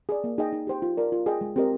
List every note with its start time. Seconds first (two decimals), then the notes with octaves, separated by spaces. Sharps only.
0.09 G#4 D5
0.24 A#3
0.38 D#4 G#4 D#5 G5
0.53 D#4
0.67 G4 C5 G5
0.82 F4
0.97 A#4 D5 F5
1.12 F4
1.26 G#4 D#5 G5
1.41 G#3
1.56 C4 G4 A#4 D#5